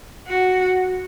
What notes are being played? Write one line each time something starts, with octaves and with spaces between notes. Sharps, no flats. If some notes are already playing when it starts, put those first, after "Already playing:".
F#4